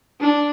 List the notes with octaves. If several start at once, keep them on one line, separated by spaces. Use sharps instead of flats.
D4